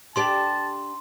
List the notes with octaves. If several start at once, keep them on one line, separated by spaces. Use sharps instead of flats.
D4 G4 D5 A5 C6